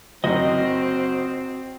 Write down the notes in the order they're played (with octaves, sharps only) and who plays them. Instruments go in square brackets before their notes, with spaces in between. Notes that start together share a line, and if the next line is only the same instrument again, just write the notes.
[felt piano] F#1 F#3 [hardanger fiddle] C4 [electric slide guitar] F#4 D#5